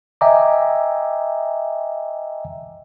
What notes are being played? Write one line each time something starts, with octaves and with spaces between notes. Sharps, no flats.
D#5 E5 G5 G#5 A#5 D6